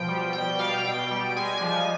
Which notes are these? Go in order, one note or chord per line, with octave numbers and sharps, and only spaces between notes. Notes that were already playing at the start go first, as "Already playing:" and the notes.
Already playing: B2 F3 G5
G3
B2 G5
G3 F5
B2 G5
G3
G#3 G#5
F3 G#5